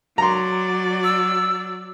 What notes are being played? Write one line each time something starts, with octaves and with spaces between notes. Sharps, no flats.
F#3 D5 A#5 C6
E6